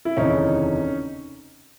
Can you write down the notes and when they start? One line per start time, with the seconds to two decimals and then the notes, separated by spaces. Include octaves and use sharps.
0.05 E4
0.17 F1 D#2 C#3 E3 C#4 D#4